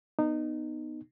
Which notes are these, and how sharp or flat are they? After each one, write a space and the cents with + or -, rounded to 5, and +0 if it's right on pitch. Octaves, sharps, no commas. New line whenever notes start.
B3 +0 D#4 -20